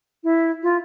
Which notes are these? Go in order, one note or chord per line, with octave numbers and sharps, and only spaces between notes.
E4
F4